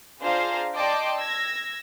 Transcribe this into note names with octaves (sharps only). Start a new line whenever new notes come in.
D4 F4 G#4 C5 F5 A#5
D5 D#5 G5 A5 C6 D6
E6 G#6 A#6